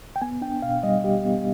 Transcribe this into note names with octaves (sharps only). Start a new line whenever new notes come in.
G5
B3 G#5
D4 G5
B2 F5
G3 D#5
G3 G4
B3